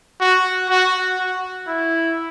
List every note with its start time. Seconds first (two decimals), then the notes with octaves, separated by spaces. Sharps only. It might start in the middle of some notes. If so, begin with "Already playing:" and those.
0.20 F#4
0.69 F#4
1.18 F#4
1.68 E4